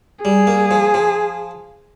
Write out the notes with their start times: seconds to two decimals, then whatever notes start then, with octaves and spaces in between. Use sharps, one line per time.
0.24 G3 G#4
0.47 A#3
0.71 F3
0.94 F3